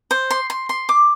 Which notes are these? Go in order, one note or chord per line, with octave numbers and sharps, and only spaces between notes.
C5
C6
C6
C6
D6